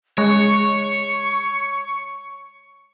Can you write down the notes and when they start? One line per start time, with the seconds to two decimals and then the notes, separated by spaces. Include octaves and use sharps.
0.18 G#3 C#5 C#6